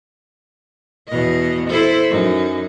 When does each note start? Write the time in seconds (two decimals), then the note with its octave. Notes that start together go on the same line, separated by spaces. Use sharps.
1.08 E2 B2 D#5
1.68 E4 A4 C5
2.10 F#2 D#4